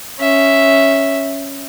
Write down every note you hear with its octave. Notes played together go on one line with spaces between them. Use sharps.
C#4 E5